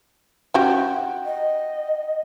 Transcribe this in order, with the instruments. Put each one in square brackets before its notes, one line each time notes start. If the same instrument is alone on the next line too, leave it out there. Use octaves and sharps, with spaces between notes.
[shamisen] C#4 F#4 G4 [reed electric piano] F#5 G5
[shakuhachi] D#5